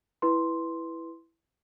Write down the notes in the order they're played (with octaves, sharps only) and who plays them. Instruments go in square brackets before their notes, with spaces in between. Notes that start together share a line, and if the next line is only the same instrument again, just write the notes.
[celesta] E4 B4 C6